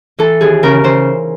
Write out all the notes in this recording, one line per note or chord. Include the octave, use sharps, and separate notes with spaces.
E3 A4
D#2 G#4
C#3 A#4
C#3 C5